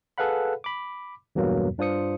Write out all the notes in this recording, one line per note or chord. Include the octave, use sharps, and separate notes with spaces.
G#4 A4 B4 F5 F#5 B5
B5 D6
E2 G2 B2 F#3 A#3
G2 D4 F4 C5 D#6 C#7